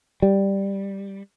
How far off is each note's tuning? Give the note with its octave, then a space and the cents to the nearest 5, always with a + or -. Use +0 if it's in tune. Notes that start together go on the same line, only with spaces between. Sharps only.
G3 +5